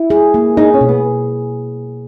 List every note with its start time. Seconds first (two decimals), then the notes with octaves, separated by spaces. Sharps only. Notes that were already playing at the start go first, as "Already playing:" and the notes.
Already playing: E4
0.10 G#4
0.34 A#3
0.57 D#4 G#4
0.74 C#4
0.81 B2
0.89 B3